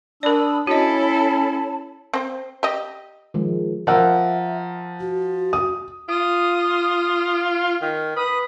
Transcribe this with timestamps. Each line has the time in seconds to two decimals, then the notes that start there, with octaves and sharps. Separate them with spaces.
0.23 D4 A#4 D5 B5 D#6 E6
0.67 C#4 E4 F#4 A4 C#5 D#5 A5 B5
2.14 C4 C5
2.63 G4 D#5
3.34 D#3 F3 G#3
3.87 F3 A#4 E5 F#5 E6
5.00 F#4
5.53 D#6
6.09 F4 D#6
7.82 D#3
8.16 B4 D#6